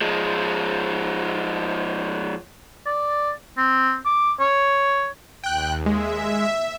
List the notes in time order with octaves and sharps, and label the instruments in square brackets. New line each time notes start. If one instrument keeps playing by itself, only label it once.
[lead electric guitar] F3 G#3
[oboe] D5
C4
D6
C#5
[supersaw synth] D#2 [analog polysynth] G5 F#6
[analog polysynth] G#3 [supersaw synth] E5